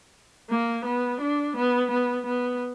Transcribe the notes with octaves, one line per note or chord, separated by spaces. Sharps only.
A#3
B3
D4
B3
B3
B3